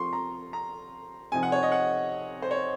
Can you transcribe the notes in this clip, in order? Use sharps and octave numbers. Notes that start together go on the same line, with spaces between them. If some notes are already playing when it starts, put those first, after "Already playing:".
Already playing: F3 C4 F4 C6 C#6
A#5
A#5
C3 F3 C4 D#4 G#5
F#5
C#5
D#5
F#5
C5
C#5